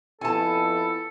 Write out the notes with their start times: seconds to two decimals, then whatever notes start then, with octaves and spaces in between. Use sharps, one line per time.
0.21 F2 B3 E4 A4 G#5 A5